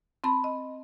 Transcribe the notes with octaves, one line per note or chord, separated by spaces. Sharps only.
C4 A5 B5
D#5